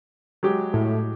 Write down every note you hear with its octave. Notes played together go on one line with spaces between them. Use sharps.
F#3 G#3 G4
A2